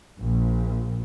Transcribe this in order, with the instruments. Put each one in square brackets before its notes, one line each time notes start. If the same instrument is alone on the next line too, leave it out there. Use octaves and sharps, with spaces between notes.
[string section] A#1